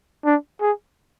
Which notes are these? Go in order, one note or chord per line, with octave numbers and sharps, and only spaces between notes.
D4
G#4